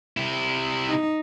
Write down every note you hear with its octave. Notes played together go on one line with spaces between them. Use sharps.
C3 E4
D#4